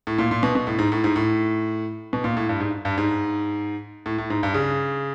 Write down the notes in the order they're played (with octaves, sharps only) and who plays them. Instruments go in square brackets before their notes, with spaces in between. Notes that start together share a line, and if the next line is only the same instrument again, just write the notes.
[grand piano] A2
A#2
A#2
B2
B2
A2
G#2
A2
G#2
A2
B2
A#2
A2
G2
G#2
G2
G#2
A2
A2
G#2
G2
C#3